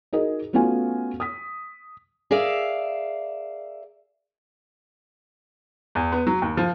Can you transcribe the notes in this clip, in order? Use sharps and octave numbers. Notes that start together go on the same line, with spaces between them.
D#4 F#4 G#4 A#4 D#5
A3 B3 C#4 F4 F#4 G#5
D#6 B6
G#4 A#4 D5 E5 F5
E2
B3
F#3
D#2
F3